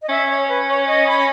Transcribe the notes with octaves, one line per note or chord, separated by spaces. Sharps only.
D#5
C#4 E5
C#5
B4
C#5
D#5
B5